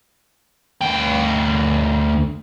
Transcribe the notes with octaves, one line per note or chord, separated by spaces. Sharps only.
D2 G5